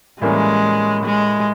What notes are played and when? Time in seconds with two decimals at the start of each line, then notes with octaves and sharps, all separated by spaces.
0.21 A2 E3 G3 G#3 A#3 C#4
1.05 G#3